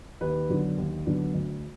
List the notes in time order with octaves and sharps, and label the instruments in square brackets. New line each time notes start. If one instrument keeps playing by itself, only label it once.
[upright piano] D#2 B4
D3 F#3 B3 D4
D#2
D3 F#3 B3 D4
D2